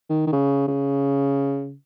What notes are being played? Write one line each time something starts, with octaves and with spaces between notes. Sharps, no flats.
D#3
D#3
C#3
C#3